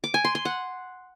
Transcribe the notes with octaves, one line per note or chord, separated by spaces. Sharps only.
D6
G#5
C6
C6
F#5